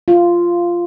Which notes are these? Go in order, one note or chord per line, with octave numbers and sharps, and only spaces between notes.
F4